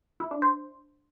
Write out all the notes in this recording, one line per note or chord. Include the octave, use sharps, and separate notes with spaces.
E4
D4
C5